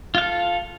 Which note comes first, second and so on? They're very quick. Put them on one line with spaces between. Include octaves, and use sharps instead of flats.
F4 F5 A4